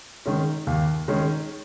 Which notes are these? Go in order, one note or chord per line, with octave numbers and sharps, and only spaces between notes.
D#3 G#3 C#4
D#2
D#3 G#3 C#4